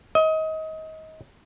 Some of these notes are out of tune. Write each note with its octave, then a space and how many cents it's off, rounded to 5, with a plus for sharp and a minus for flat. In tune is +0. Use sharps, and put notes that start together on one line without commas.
D#5 +25